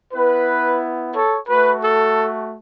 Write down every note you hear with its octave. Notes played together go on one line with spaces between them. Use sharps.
B3 E4 B4
A4 C#5
A3 F#4 B4
A4